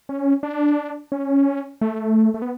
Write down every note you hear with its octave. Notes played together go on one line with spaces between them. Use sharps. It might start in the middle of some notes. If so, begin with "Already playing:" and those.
C#4
D4
C#4
A3
A3
B3